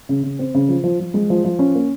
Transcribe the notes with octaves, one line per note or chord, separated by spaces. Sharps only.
C#3
C#3
C4
C#3
F3
F3
F3
G#3
F3
F3
C#4
A#3